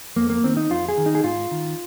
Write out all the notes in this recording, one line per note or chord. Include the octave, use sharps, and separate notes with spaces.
F2 A#3
A#3
D#3 C4
D#4
F2 F4
G#4
D#3
D#4
G#4
G#2 F4
D#3